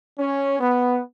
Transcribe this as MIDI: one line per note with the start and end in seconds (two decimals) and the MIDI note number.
0.19 0.58 61
0.60 1.00 59